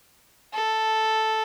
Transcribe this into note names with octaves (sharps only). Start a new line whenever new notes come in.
A4